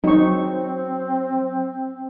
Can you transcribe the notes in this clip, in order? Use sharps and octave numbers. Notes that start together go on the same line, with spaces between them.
F#3 C4 D#4 C#6